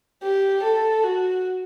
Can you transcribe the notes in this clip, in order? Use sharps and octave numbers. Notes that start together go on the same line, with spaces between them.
G4
A4
F#4